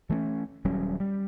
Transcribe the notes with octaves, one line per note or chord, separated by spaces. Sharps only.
E3 A3 C4 C#4
D#1 F#3 G3 C#4
G3